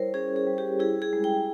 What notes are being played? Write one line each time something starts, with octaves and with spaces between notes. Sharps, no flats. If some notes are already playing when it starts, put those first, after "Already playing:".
Already playing: G3 E4 A#4 C5 C#5
C#4 G#4
G#4
G3
G4
E4 G#4
G#4
G#3
G5